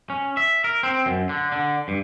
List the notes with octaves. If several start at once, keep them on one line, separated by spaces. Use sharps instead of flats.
C#4
E5
A#4
C4
F#2
D3
D3
G2